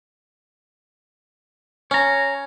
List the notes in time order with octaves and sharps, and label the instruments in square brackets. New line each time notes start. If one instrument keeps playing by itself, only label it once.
[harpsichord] C#4 [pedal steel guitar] C#5 A#5